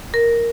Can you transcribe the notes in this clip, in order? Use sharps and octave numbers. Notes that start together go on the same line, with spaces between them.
A#4